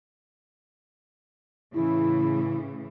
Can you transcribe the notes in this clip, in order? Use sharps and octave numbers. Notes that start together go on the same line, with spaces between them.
A2 C#3 E3 E4